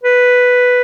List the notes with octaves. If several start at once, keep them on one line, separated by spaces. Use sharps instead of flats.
B4